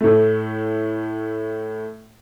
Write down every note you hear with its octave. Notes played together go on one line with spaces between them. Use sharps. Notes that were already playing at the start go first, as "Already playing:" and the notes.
A2 A3